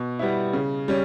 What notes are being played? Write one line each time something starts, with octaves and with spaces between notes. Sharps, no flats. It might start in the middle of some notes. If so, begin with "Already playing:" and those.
Already playing: B2
G3 B3 E4
C#3
G3 C#4